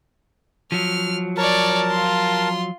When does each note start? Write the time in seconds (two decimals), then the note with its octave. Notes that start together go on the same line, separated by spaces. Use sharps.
0.72 F3 F#3 F6
1.37 A#4 C#5 D5 A5
1.91 F4 C6